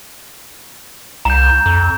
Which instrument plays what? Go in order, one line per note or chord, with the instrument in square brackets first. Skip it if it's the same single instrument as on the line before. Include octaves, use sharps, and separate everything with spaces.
[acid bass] C2 [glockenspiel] A#5 G6
[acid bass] F2